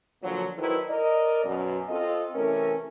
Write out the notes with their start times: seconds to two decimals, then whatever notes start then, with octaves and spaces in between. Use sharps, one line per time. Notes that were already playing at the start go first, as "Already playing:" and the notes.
0.23 A#2 D3 F3 F#3
0.58 D#3 F#3 E4 A4 B4 C5
0.88 A#4 D5 D#5
1.44 F#2 B2
1.89 C4 F4 A4 D#5
2.35 C3 E3 A3 C#4 A#4